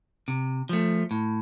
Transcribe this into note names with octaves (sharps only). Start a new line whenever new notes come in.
C3
F3 A3
A2